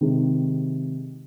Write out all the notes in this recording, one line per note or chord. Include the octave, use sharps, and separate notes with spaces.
C3 D#3 G#3